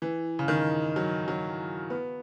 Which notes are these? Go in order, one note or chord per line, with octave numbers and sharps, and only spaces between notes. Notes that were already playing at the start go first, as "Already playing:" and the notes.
E3
C#3
D#3
F#3
F#3
B3